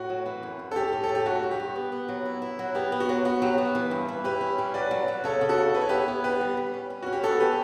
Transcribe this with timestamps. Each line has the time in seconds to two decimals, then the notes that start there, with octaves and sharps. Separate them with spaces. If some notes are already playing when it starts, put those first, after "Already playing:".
Already playing: A2 F#4
0.10 F#3
0.26 E3
0.43 F#2
0.59 F#2
0.71 A4
0.76 C#4 G4
0.93 A2
1.04 A4
1.09 A2
1.15 G4
1.26 F#3 F#4
1.43 G2
1.51 G4
1.60 G2
1.76 B3
1.92 B3
2.09 F#3
2.25 E4
2.42 E4
2.59 F#3
2.75 B3 G4
2.92 B3
3.00 F#4
3.09 F#3
3.25 B3 F#4
3.42 F#3 G4
3.58 B3
3.75 E3
3.91 G2
4.09 E3
4.24 E4 G4 B4
4.41 C#4
4.58 G3
4.74 F#3 B4 D5
4.91 F#3
5.08 F#3
5.24 C#3 A4 C#5
5.41 C#3
5.49 F#4 A4
5.58 C#3
5.74 E4 B4
5.81 C#5
5.89 B3 G4 B4
6.08 B3
6.24 D3 G4 B4
6.41 G3
6.57 G3
6.74 C#4
6.90 C#4
7.03 C#4 F#4
7.13 G4
7.23 B3 F#4 A4
7.40 G4 B4